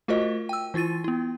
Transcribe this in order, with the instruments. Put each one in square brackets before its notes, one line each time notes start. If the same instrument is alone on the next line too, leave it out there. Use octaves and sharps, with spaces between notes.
[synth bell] A3 F4 F#4 A#4 C5 D#5
G5 E6
E3 E4 F4 A6 D#7
B3 E4